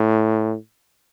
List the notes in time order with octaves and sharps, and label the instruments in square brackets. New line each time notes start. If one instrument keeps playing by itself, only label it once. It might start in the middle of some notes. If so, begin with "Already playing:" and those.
Already playing: [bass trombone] A2